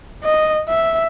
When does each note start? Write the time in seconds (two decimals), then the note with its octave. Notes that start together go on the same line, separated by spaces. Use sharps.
0.24 D#5
0.69 E5